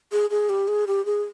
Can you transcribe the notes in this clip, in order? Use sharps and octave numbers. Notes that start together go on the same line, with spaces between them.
G#4
G#4
G4
G#4
G4
G#4